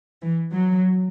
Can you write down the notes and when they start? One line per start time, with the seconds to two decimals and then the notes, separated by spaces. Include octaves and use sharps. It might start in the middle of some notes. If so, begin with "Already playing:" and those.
0.23 E3
0.51 F#3